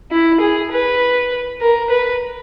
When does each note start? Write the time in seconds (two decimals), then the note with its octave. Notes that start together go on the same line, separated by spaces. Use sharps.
0.11 E4
0.40 G#4
0.71 B4
1.61 A#4
1.90 B4